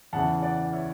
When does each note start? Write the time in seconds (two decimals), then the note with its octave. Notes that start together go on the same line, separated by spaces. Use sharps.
0.13 E2 C#3 E3 F#5 A5
0.43 D5 F#5
0.73 C#5 E5